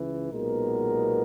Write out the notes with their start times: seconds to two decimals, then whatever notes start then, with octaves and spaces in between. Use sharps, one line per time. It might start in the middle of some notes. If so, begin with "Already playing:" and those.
Already playing: C#2 C#3 E3
0.31 B1 A#2 G#3 B3 A#4